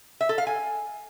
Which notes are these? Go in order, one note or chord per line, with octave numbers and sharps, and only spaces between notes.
E5
A4
F5
G#5